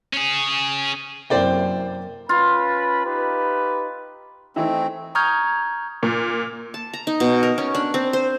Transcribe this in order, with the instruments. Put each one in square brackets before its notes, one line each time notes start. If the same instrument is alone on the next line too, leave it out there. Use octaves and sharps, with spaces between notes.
[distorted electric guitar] C#4 G#4
[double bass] F#2 [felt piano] C3 A#3 E4 [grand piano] C5 D5 G5
[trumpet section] C#4 B4 B5 [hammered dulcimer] F4
[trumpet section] D#4 G4 B4
[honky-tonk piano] E3 D#4 E4 [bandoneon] A3 C4
[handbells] A#5 C#6 D#6 F6 G6 G#6
[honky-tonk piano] A#2
[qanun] A5
A#5
D#4
B2
A#4
C#4
D4
C4
C5